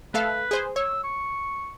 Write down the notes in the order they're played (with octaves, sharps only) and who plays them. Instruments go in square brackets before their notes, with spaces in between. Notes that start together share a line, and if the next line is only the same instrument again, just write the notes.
[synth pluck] A3 A4 F5 [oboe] B4
[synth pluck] G#4 C5
[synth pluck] C#5 [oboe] E6
[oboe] C#6